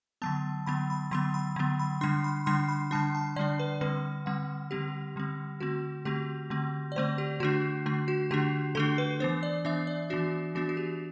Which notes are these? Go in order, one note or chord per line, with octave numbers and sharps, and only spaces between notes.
D3 F#3 B3 A5
D3 F#3 B3 B5
B5
D3 F#3 B3 C6
B5
D3 F#3 B3
B5
D3 G3 D4 C6
B5
D3 G3 D4 C6
B5
D3 G3 D4 A5
A5
D3 G3 D4 D5
B4
D3 G3 C4 B4
D3 G3 C4 F#5
D3 G3 C4 G4
D3 G3 C4
D3 A3 C4 F#4
D3 A3 C4 G4
D3 A3 C4
D5
D3 A3 C4 C5
G4
D3 A3 D4 F#4
D3 A3 D4
F#4
D3 A3 D4 G4
D3 A3 D4 A4
B4
E3 B3 D4 C5
D5
E3 B3 D4 E5
D5
E3 B3 D4 F#4
E3 B3 D4 F#4
F#4
G4